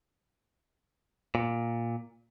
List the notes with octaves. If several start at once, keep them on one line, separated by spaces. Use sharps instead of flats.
A#2